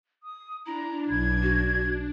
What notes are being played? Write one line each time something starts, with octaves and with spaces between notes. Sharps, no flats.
D#6
D4 E4 A#5
B1 G#6
F#4